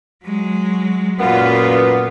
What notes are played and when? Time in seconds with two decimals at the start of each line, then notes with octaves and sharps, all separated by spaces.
0.24 F#3 G#3
1.19 F#2 A#2 B3 F4